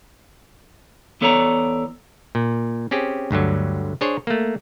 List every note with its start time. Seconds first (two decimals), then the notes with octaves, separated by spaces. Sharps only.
1.21 E2 B3 A4 C#5 D5 A#5
2.35 A#2
2.91 C4 C#4 G4 G#4
3.31 D2 G2 D3 F#3
4.01 D4 G#4 C5 C#5
4.27 A3 A#3